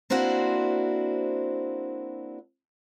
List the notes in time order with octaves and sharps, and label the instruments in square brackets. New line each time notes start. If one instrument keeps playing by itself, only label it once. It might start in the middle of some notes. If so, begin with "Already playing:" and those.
[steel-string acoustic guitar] A#3 C4 D4 E4 F#4 C5